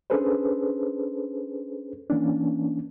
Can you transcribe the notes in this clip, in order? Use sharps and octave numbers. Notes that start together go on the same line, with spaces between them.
C#4 D4 G#4 A4 B4 C5
E3 A#3 C#4 D4